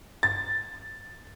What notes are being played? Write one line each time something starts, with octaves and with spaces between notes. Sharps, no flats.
A6